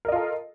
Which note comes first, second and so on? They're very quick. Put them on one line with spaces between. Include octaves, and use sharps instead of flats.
A#4 D#5 F4 A4